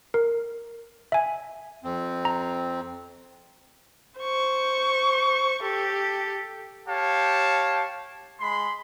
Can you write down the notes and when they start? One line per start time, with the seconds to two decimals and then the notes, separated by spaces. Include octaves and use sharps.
0.14 A#4
1.12 E5 G#5
1.84 F2 C4
2.25 A#5
4.20 C5 C#6
5.63 G4 A4
6.87 G4 C#5 F5 A5
8.40 G#3 B5 C6